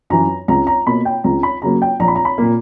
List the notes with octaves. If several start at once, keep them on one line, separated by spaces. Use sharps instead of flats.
F#2 E3 A#5
C#2 A#5
A#5
B2 A#3 B5
G5
C#2 A#5
B5
C#3 F#3 A#3 A#5
G5
A#1 A#5
B5
A#5
B5
A#2 A#3